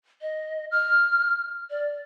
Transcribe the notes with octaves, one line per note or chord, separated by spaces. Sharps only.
D#5
F6
D5